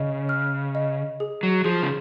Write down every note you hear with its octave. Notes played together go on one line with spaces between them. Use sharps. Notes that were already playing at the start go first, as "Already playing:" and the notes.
Already playing: C#3 D#5
F6
D#5
G#4
F#3
F3 G#4
C#3